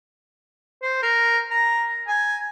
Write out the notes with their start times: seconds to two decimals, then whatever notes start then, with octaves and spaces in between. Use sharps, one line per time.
0.82 C5
1.02 A#4
1.51 A#5
2.08 G#5